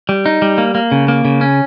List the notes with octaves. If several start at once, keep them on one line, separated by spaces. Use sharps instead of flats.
G3
D#4
G3
A#3
A#3
C#3
A#3
C#3
C#4